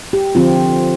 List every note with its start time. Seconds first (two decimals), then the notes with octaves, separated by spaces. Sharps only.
0.13 G4
0.35 D3 F3 C4 F4